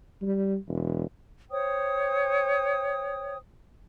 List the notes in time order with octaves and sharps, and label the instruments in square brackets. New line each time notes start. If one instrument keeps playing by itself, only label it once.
[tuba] G3
E1
[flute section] C5 C#5 G5 D#6